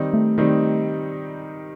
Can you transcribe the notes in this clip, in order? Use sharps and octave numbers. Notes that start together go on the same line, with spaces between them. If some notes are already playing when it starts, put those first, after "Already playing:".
Already playing: D#3 G3 C4 D#4
A3
D#3 G3 C4 D#4